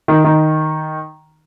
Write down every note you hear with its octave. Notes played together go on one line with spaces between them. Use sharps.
D#3 D#4
D#3 D#4